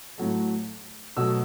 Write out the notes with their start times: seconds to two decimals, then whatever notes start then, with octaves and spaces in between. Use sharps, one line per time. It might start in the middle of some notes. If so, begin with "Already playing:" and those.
0.18 A2 F#3 A3
1.17 B2 F#3 A3 E6